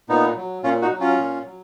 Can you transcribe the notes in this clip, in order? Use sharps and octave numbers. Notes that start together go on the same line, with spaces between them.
A#2 B3 D#4
F#3
A#2 C#4 F4
D#4 F#4
F#3
C#4 F4
A#2
F#3